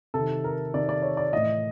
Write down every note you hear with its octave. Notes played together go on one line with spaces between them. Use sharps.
C3 D#3 A4
A#4
C3 D#3 D5
D5
C#5
D5
A2 E3 D#5